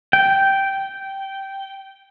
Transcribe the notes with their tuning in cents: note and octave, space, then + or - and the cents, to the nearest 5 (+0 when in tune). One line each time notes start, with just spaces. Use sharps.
G5 -10